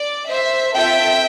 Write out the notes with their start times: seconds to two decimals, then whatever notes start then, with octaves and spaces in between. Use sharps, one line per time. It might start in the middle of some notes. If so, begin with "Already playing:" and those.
Already playing: D5
0.30 C5 E5
0.75 C4 F4 A4 E5 G5